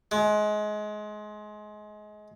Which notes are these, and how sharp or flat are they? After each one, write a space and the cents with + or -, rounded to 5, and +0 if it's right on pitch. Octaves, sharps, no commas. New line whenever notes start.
G#3 +25